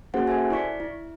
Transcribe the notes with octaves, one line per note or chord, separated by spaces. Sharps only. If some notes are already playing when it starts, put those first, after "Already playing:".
A#3 C#4 F#4 G#4 C5 F#5
A4 C5 E5 G#5
E4 D5 C#6 B6
E4